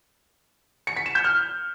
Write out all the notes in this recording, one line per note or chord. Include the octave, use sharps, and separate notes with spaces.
C#7
B6
E7
G6
F6